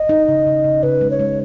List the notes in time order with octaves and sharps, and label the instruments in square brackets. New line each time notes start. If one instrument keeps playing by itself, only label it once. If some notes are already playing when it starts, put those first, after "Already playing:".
Already playing: [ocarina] D#5
[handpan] D#4
C#3
C#3
C#3
[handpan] C#3 [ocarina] B4
[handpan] G#3
[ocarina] C#5
[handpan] G#3